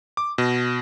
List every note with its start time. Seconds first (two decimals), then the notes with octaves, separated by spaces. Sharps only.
0.17 D6
0.38 B2